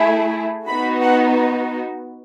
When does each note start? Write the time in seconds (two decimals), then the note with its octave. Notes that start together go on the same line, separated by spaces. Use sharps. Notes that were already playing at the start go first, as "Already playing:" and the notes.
Already playing: A3 E4 G#4
0.68 B3 D#4 F#4 B5
1.02 F#5